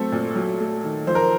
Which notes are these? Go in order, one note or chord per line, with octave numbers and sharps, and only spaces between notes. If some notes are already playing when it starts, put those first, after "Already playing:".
Already playing: F#3 A3 C4 A4
A#2
F#3
A3
D#3
F3 C5
A#4